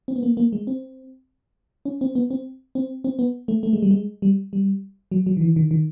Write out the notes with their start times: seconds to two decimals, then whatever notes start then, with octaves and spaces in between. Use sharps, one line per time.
0.08 C4
0.16 B3
0.23 A#3
0.37 A#3
0.53 G#3
0.67 C4
1.85 C#4
2.01 C4
2.15 B3
2.30 C4
2.75 C4
3.04 C4
3.19 B3
3.48 A3
3.63 A3
3.73 G#3
3.82 G3
3.91 G#3
4.22 G3
4.53 G3
5.12 F#3
5.26 F#3
5.37 D#3
5.41 E3
5.56 D#3
5.71 D#3